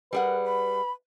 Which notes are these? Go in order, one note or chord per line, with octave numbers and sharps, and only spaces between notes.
G3 G#4 A#4 B4 F#5
B5